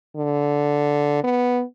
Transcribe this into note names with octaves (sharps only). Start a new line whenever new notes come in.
D3
B3